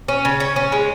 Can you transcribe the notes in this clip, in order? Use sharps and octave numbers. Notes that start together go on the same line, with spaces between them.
C#4
C#3
C#4
C#4
G#3